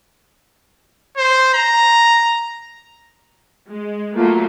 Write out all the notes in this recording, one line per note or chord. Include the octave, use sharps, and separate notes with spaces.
C5
A#5
G#3
F#3 A3 A#3 F4